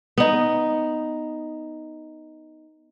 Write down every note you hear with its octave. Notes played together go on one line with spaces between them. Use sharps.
B3 D#4